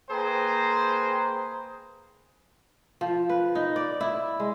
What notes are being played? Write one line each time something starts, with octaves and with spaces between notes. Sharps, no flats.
A#3 G#4 B4 C5 G5 A#5
F3
B4
D#4
D5
E4
G#3